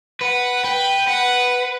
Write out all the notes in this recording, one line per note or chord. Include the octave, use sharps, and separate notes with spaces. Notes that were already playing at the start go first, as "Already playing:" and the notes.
B4 F#5
B4 G5
B4 F#5